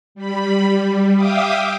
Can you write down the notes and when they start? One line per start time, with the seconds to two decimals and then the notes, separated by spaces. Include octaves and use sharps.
0.15 G3 B5
0.67 G3
1.15 E5 F5 G5 D6 D#6